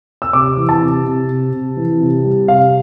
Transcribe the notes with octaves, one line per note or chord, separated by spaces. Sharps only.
E6
C3 D6
E3
A5
C3
C3
C3
C3
E3
C3
G3
C3 F5